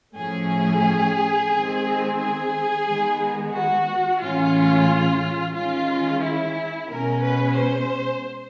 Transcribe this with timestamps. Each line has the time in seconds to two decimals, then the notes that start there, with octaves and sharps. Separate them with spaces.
0.16 A2 F3 A3 C#4 G#4
1.51 D#3 G#3 C4
2.19 G#4
2.86 D#3 G#3 B3
3.53 F#4
4.20 A2 E3 G#3 C#4 F4
5.55 D#3 G#3 C#4 F4
6.22 E4
6.89 B2 G#3 C#4 A#4
7.23 B4
7.57 C5